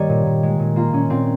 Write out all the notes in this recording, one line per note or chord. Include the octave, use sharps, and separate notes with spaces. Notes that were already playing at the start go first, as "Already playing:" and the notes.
Already playing: G2 D#3 G3 A#3 C#5 D#5 G5
A#2
A#2
G#3
A#2
A#3 F4
A#2 C#4
A#2 C4